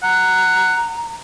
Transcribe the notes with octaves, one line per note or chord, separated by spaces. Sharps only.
F#5 A#5